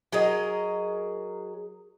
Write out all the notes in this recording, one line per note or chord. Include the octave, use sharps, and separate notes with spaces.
F#3 G#4 A#4 D#5